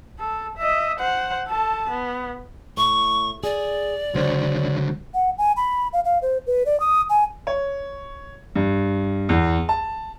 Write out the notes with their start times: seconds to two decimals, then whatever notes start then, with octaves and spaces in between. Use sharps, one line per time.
0.19 A4
0.58 D#5 E5
1.00 C5 F#5
1.48 A4 A5
1.90 B3
2.77 A2 C#6
3.44 G#4 D5
4.14 C#2 D3 F#3 C5 C#5
5.14 F#5
5.38 G#5
5.56 B5
5.93 F5
6.05 F5
6.22 C5
6.47 B4
6.66 D5
6.80 D#6
7.10 G#5
7.47 C#5
8.56 G2
9.29 E2
9.69 A5